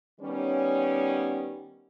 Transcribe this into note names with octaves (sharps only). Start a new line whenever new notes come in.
D#3 G3 B3 C#4